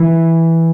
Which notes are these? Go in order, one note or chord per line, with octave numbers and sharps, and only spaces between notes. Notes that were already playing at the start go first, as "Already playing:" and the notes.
Already playing: E3